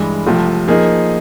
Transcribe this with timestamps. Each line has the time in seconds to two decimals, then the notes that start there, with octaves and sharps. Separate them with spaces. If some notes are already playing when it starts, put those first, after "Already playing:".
Already playing: G2 E3 G#3
0.27 C2 C3 F3 A3
0.68 F3 A#3 D#4 G#4